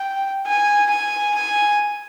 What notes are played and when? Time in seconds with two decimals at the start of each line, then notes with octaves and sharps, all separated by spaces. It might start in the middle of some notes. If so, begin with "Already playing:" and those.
Already playing: G5
0.47 G#5
0.90 G#5
1.35 G#5